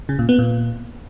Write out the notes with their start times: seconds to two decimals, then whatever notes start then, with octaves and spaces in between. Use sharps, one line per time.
0.09 C#3
0.19 A#2
0.29 B3
0.39 A#2